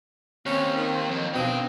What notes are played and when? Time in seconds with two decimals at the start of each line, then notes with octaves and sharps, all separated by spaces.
0.46 D#2 C4 C#4
0.76 D#3
1.11 F2
1.34 B2 C4 D4 F5 G5 D#7